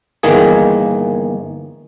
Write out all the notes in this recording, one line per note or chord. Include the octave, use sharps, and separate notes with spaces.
G1 D#3 E3 A#3 G#4